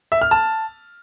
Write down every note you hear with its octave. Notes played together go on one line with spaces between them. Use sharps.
E5
F6
A5